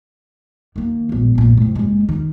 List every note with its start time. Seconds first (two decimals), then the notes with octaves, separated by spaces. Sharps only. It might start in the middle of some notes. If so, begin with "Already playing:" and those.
0.76 D#3 A#3
1.09 E1 A#1
1.35 A#1 A#2
1.57 A2 C3
1.76 F#1 G#3
2.09 D#3